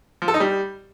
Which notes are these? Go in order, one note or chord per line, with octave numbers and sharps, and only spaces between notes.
F3
A4
D#4
G3